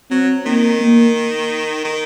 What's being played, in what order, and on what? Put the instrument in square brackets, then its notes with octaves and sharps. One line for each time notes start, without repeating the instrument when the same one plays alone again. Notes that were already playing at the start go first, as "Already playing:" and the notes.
[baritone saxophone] F#3 [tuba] C4
[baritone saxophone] D#3 [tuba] A#3
[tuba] A#3
[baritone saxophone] D#3